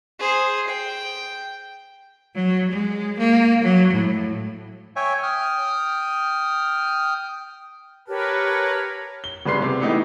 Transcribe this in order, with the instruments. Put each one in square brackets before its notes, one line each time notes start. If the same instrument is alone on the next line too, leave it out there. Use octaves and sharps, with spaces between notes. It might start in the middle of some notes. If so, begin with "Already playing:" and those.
[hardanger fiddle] G#4 C5
G5
[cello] F#3
G#3
A#3
F#3
A2
[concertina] C#5 E5 G5 G#5
G5 D#6 F6
[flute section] G4 C#5 A5 [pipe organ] A#4 B4
[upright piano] G7
G1 C#3 G3 B4 C6 C7
C3
E3 A3 B3 D#4 G4